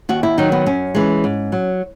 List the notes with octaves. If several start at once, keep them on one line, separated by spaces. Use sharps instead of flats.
D#2 F#4
E4
D#3 F#3 D#4
B3
F#2 C#4
E3 G#3
G#2
F#3